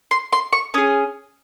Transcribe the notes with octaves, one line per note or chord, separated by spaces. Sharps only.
C6
C6
C#6
C#4 G#4 D#6